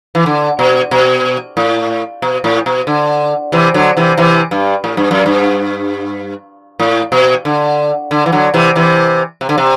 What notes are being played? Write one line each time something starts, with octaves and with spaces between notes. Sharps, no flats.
E3
D3
B2
B2
A2
B2
A2
B2
D3
C3 E3
D3 F#3
C3 E3
C3 E3
G2
A2
G2
F#2
G2
A2
B2
D3
D3
E3
D3 F#3
C3 E3
C3 E3
C3
D3
C3